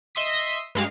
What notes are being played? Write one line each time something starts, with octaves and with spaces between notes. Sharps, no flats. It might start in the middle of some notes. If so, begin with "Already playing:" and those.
D#5 E5 C6 D#6 B6
G2 G#3 F5